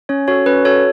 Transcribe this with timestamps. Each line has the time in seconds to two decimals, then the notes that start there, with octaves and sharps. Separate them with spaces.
0.09 C#4 C#5
0.28 F#4 A4 C#5
0.46 C#4 B4
0.65 F#4 A4 C#5